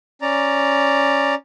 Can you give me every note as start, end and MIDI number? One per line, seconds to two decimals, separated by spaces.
0.22 1.35 61
0.22 1.35 74
0.22 1.35 82